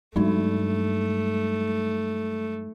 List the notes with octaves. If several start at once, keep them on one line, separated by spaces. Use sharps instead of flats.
G2 F#3 G#3 A3 D4 D#4